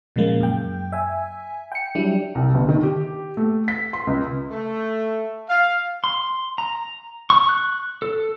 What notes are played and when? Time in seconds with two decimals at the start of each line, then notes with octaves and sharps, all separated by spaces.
0.16 A#2 C#3 F3 G#3 A#3
0.40 F#2 G5
0.92 E5 G#5
1.72 G5 C#7
1.95 F#3 G3 D4 E4
2.35 C2
2.55 G1
2.69 D#3
2.83 G4
3.37 A3
3.68 B6
3.93 C6
4.07 C#2
4.50 A3
5.50 F5
6.04 C6
6.58 A#5
7.30 C#6
7.49 F#6
8.02 A4